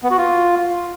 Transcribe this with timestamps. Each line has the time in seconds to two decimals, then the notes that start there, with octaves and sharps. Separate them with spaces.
0.03 B3
0.11 F#4
0.18 F4